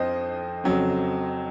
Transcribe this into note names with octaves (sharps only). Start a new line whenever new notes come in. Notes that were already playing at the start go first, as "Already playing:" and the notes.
Already playing: F2 F3 C4 C5 D#5
F2 C#3 F#3 C4